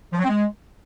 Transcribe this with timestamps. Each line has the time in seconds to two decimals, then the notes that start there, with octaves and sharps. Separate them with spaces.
0.13 F3
0.18 F#3
0.24 C4
0.29 G#3